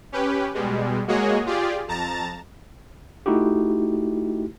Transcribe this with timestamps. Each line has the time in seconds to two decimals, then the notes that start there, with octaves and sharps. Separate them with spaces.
0.12 C#4 G4 B4
0.54 B2 G3 G#3
1.08 G#3 A#3 F#4 G#4 C#5 D#5
1.46 F4 G4 G#4 D5
1.88 F2 A5 A#5 A6
3.26 A3 D#4 E4 F#4 G4